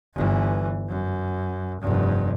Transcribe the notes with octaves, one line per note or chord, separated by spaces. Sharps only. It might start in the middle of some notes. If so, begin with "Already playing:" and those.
G1 E3
F#2
F1 G2